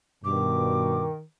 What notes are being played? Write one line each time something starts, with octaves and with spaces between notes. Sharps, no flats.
G2 B2 D#3 D6